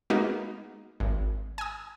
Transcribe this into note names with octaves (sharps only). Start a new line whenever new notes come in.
G#3 A#3 B3 D#4 F#4
G#1
G#5 D#6